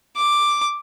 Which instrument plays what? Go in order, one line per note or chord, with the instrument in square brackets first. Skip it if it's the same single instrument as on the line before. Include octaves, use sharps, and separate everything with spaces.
[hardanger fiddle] D6